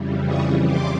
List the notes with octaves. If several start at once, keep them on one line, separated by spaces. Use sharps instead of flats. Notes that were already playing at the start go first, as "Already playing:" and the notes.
Already playing: F2 C#3 E3 G3
C#6 D#6
C6 D6